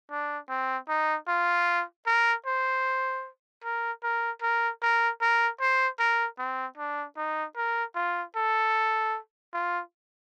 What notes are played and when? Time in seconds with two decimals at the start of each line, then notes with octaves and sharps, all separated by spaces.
0.11 D4
0.49 C4
0.89 D#4
1.28 F4
2.07 A#4
2.46 C5
3.64 A#4
4.03 A#4
4.42 A#4
4.83 A#4
5.21 A#4
5.60 C5
5.99 A#4
6.39 C4
6.78 D4
7.17 D#4
7.57 A#4
7.95 F4
8.36 A4
9.53 F4